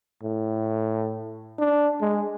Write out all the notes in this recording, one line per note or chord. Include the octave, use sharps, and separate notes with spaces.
A2
D4
G#3